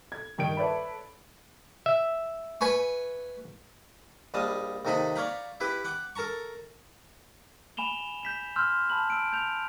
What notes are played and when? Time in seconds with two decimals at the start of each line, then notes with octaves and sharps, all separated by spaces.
0.12 G#6
0.38 G2 D#3 G5 D7
0.57 A4 B4 C#5 D5 E5 B5
1.86 E5
2.61 B4 G#5 C#6
4.34 A#1 G3 D#5 F5 A5
4.85 D#2 C3 D#4 A4 E5 B5
5.15 C#5 D5 F5 G5 A#5 B5
5.60 E4 G4 B4 B5
5.85 F#5 G5 D6
6.16 A4 A#4 A5 A#5 C#6
7.77 G#5 B5 E7 F7 G7
8.23 G6 B6 E7
8.56 C6 E6 F6 G6
8.90 A5 B5 F#7
9.10 E6 D7
9.33 G6 F7